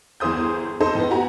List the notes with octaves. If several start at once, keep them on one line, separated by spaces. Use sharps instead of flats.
G1 E2 G#4 C5 D#6 G6
D#4 A4 C5
A2 B3
F#4 G4 F#5 G#5 A#5